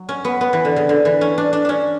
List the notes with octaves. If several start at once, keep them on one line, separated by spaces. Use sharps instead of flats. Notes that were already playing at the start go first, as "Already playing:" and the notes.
Already playing: F#3
C#4
B3
B3
E3
D3
C#3
D3
E3
C#4
D4
D4
C#4 D4